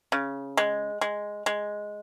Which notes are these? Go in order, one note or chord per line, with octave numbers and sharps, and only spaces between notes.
C#3
G#3
G#3
G#3